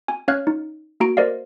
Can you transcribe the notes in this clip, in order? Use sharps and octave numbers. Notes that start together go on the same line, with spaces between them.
G#5
C#4 C#5 F5 F6 F#6 G#6
D#4
A#3 F#4 A#5 D7
A#4 C5 D5 D#5 F5